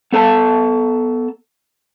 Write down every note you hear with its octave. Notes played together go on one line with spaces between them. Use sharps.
B3 A4 G#5 A5